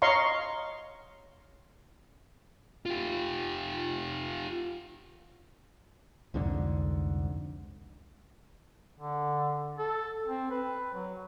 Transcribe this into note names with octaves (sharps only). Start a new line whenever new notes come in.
C#5 D#5 F5 A#5 C6 C#6
F4 G4
C2 F2 G#2 D3
D3
A4
C4
B4
F#3